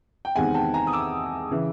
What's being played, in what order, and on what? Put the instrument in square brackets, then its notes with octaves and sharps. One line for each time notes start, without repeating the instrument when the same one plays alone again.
[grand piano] G5
E2 C3 D#3 G#3 C4 F#5 G#5
G5 A5
G#5 A#5
D#6
D6 E6
C#3 E3